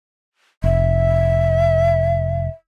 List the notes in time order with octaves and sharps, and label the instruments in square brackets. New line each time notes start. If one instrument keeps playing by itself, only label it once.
[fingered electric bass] F1 [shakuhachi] E5